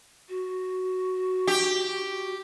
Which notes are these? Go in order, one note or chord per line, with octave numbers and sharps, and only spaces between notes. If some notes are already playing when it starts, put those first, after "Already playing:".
F#4
G4